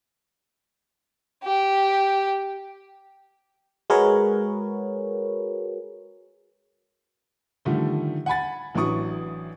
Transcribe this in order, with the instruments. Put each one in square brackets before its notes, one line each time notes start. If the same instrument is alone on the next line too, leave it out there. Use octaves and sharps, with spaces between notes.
[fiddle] G4
[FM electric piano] G#3 F#4 G#4 A#4 B4 C#5
[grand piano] D3 D#3 F3 G3 A3
F#5 G#5 B5 A6
A1 E3 F#3 D4 C#6 D#6